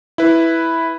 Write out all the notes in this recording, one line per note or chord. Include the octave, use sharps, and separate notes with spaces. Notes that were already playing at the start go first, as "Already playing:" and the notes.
E4 B4